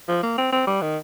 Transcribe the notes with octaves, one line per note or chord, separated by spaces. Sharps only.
F3
A#3
C4
C4
G3
D#3